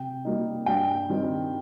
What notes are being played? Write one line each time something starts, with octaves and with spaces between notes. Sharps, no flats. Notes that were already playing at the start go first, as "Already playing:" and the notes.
Already playing: C3 G5
G3 A#3 D#4
G2 G5
D#3 G3 C4 D#4